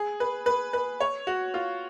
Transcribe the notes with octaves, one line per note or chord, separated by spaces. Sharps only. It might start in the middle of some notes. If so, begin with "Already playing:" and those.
Already playing: G#4
B4
B4
B4
C#5
F#4
F4